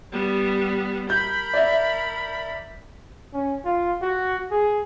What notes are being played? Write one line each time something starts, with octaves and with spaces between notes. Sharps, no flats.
G3 B3
A#4 B5 G6
D5 E5
C#4
F4
F#4
G#4